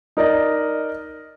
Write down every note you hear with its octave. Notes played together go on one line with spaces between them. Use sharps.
D#4 A#4 D5 D#5